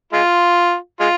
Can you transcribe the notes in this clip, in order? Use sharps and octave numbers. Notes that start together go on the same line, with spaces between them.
G#3 F4
G#3 F4